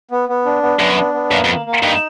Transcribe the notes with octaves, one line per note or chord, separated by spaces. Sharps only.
B3
B3
D4
B3
F#2 B3
D4
B3
F#2 A#3
F2
A#3
A#3
G2 D#4